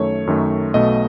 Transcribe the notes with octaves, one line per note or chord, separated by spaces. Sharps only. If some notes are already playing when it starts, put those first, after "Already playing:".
Already playing: F#2 D#3 A3 C#5
F#2 D#3 A3
B1 B2 A3 D#5